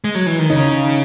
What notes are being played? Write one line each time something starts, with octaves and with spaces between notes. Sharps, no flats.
G#3
F#3
E3
D#3
C#3 D#4